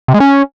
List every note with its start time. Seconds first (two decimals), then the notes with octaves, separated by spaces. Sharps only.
0.08 C3
0.14 G#3
0.20 C#4